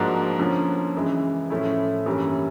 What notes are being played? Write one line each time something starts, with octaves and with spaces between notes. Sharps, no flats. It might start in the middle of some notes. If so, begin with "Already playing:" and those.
Already playing: G#2 F3 A#3 D4 F#4
D3 F3 A#3 C#4 F4
F#2 C#3 E3 G#3
A2 F3 A3 C#4 E4
G2 E3 G3 A#3 C#4